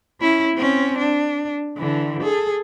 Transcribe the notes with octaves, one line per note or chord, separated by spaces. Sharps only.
C#4 E4
C4 C#4
D4
D3 E3
G#4 A4